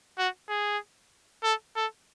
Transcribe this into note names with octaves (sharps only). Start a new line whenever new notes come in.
F#4
G#4
A4
A4